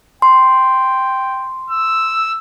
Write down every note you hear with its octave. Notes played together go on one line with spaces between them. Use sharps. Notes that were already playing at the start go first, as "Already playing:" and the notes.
G5 C6
E6